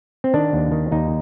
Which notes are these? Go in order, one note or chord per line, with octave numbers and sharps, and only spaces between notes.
C4
D#3 D4
D#2
D#3
D#2 D#4